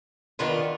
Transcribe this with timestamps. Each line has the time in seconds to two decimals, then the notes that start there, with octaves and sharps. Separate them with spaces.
0.39 D#3 B3 D4 F4